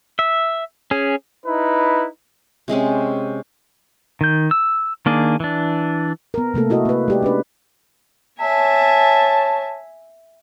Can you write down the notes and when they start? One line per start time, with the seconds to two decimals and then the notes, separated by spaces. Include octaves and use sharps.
0.19 E5
0.91 C#4 G#4
1.45 D#4 E4 B4
2.68 C3 G#3 C4 C#4
4.21 D#3 G6
4.51 E6
5.06 D#3 A#3 D4 G#4
5.40 E3 D4
6.34 B3 A#4
6.54 C3 A3 A#3 A4
6.70 E4 F#4 A4 D#5
6.85 A#3 B4
7.08 G#3 G4 D5
7.22 C#4 D4 B4
8.41 C#5 E5 G#5 A5